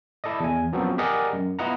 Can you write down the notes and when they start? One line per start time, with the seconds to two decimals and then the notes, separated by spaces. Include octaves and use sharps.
0.24 E4 A4 D5 D#5
0.40 E2 G#5
0.72 F#2 F3 F#3 B3 C4 F#4
0.98 G4 G#4 A#4 D5 D#5 F#5
1.32 F#2
1.59 B3 E4 F4 D#5 F#5 A#5